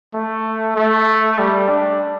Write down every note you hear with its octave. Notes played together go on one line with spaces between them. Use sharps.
A3
A3
G3
D4